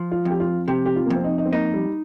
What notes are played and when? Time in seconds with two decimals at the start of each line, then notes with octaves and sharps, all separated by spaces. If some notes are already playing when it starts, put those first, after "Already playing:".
Already playing: F3
0.12 F4
0.25 F2
0.30 G4
0.40 F4
0.68 C3 G4
0.85 G4
0.96 F4
1.06 A#3
1.10 F2
1.16 C4
1.24 D#4
1.38 D#4
1.45 C4
1.52 A#3 D#4
1.74 G3